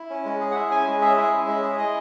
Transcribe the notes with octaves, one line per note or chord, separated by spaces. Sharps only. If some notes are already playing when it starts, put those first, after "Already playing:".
Already playing: E4
C#4
G#3
G#4
F#5
E4 E5
C#4 G#5
G#3
G#4 E5
E4 E5
C#4
G#3
G#4
E4 D#5